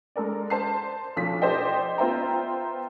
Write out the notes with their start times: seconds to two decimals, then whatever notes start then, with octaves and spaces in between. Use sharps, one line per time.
0.16 G#3 A4 A#4 D5
0.50 C5 A5 C7
1.16 B1 F3 B6
1.42 G4 A4 C5 D5 D#5 G5
1.98 B3 F4 C5 E5 G5 A#5